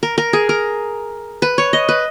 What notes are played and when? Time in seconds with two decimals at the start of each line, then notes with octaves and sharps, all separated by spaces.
0.03 A#4
0.18 A#4
0.33 G#4
0.49 A#4
1.42 B4
1.58 C#5
1.73 D#5
1.89 B4